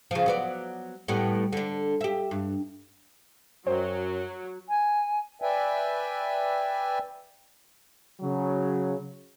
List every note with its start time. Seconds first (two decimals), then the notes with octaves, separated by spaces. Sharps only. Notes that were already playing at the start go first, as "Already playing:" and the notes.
0.11 C#3 F3
0.26 F#3 B3 D5
1.08 A2 G3 B3
1.53 D3 D4
2.01 G4 E5
2.31 G2
3.67 F#2 F#3 C5 G5
4.69 G#5
5.42 B4 D5 E5 G5 G#5
8.21 C#3 F#3